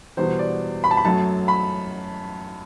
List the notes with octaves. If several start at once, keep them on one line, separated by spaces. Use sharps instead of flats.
E2 B2 G3 C5
D5
B5
A5
B5
F#2 F#3 A3 A5
B5